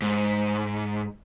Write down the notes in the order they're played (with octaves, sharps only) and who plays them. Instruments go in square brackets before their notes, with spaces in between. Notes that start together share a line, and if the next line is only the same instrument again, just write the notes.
[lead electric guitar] G#2